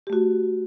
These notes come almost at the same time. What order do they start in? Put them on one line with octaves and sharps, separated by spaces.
G4 A3 F#4